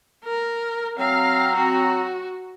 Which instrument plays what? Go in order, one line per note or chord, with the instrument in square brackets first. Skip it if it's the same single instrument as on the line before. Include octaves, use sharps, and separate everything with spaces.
[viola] A#4
[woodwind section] F#3 C4 A#5 [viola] F5
[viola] F#4